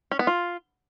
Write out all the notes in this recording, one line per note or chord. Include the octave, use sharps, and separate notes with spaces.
C#4
B3
F4